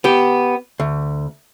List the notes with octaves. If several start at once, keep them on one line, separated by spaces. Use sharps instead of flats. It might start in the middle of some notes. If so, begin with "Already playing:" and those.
B3 G4
D2